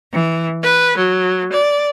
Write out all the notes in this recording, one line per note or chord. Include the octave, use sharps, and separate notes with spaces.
E3
B4
F#3
D5